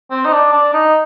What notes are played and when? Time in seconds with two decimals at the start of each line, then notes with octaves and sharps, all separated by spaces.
0.11 C4
0.25 D#4
0.32 D4
0.52 D4
0.73 D#4